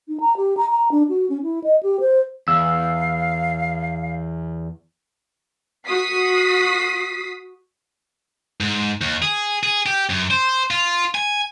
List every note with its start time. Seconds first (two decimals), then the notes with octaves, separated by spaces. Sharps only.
0.08 D#4
0.20 A#5
0.37 G4
0.57 A#5
0.70 A#5
0.91 D4
1.09 F#4
1.29 C#4
1.43 E4
1.64 D#5
1.83 G4
2.00 C5
2.48 E2 F5 E6
5.87 F#4 D#6 B6 C7
8.61 G#2
9.01 D#2
9.22 G#4
9.63 G#4
9.86 G4
10.10 F#2
10.31 C5
10.71 F4
11.15 G#5